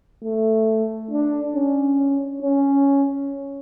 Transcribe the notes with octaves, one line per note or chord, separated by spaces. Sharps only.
A3
D4
C#4
C#4